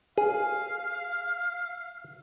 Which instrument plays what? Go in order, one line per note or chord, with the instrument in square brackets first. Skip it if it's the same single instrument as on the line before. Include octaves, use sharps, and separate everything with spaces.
[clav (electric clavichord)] G#4 [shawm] F5